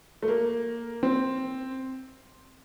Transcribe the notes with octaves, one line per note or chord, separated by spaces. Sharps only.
A3
A#3
C4